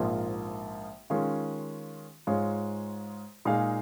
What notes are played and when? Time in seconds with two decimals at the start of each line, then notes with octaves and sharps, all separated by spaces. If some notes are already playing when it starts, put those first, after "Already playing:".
Already playing: A#1 G#2 F3 A#3 F4
1.10 D#3 G#3 C#4 F4
2.27 G#2 G#3 F4 C#5
3.45 A#2 G#3 D#4 G#4 F5